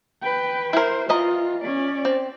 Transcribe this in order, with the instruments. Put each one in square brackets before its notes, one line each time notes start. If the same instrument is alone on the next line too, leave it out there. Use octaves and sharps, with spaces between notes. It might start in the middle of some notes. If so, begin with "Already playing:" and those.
[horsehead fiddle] B4 G5
[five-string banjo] E4 A#4 [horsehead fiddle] C5
[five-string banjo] E3 D#5 A#5 [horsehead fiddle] F4
[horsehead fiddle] C#4 D5
[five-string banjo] C4